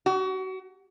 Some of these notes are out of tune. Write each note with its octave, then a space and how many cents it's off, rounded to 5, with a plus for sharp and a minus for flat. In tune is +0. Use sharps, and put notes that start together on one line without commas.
F#4 +30